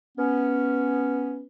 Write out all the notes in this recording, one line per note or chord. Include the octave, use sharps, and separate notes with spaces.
B3 C#4